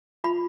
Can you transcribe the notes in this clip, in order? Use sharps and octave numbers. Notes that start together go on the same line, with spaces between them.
F4 B5